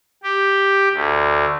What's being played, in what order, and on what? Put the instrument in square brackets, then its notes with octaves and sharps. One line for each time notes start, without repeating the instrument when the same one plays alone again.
[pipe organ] G4
D2